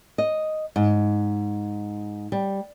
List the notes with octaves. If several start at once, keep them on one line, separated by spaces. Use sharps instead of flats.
D#5
G#2
G3